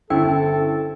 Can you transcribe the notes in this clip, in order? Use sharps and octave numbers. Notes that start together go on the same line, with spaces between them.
G1 C#4 E4 A4 C5 G5